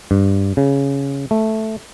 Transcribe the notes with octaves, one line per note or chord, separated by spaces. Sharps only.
G2
C#3
A3